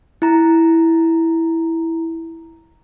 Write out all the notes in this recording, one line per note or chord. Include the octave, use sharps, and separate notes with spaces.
E4 A#5